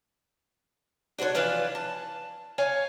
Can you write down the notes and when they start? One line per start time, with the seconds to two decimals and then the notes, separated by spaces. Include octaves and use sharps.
1.18 D4 F#4 A4 C5 C#5
1.35 E3 F3 D4 F4 B4
1.75 A5
2.58 C#5 F5 G#5